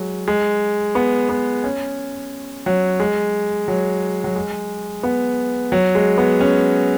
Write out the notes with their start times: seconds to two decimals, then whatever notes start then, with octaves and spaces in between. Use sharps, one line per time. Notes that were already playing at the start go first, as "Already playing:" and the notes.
Already playing: F#3 G#3
0.28 G#3
0.95 B3
1.29 B3
1.64 C#4
2.66 F#3
3.00 G#3
3.68 F#3
4.24 F#3
4.36 G#3
5.03 B3
5.72 F#3
5.95 G#3
6.18 B3
6.41 C#4